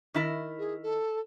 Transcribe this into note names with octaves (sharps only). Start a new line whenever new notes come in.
D#3 E4 A#4
G#4
A4